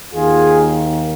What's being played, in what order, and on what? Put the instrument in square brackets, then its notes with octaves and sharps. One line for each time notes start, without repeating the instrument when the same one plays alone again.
[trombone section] D#2 D#3 A#3 F4 G#4